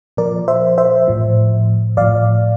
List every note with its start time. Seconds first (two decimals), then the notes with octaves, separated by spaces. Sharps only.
0.17 A#2 F3 A#4 D5
0.48 C5 E5
0.78 C5 E5
1.08 A2 F3
1.97 A2 F3 D5 F5